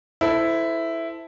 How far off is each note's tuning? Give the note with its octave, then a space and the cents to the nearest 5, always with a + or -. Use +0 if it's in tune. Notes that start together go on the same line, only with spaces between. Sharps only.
E4 +0 A4 +0 C5 -25